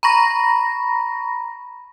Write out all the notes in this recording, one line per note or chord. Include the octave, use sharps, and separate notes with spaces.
A#5 B5 C#6 A#6